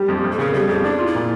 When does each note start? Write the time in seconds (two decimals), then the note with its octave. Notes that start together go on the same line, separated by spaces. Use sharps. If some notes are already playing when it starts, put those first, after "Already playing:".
Already playing: G3 G4
0.08 F2
0.24 F2
0.31 A4
0.39 C#3 A#4
0.54 G3 A4
0.68 F2 G4
0.84 D4 E4
0.99 F4
1.07 E4
1.15 A#2